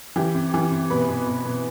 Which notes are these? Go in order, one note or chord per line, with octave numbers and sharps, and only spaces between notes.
E3 G4
C3
E3
C3
B2 B4
B2
B2
B2